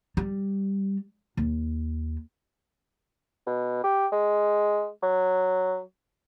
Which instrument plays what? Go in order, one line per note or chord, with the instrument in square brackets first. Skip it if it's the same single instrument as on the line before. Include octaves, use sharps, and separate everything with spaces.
[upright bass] G3
D#2
[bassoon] B2
G4
G#3
F#3